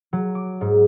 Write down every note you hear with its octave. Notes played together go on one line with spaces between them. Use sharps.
F#3
D6
G#2